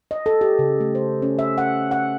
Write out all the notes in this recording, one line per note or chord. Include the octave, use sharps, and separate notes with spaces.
D#5
A4
G4
C#3
A3
C5
C#4
E5
F#5
F#5